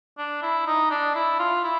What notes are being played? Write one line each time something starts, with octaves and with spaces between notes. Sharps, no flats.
D4
E4
D#4
D4
E4
F4
E4